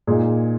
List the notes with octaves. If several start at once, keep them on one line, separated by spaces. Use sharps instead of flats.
A#2 G#3 D#4 G#4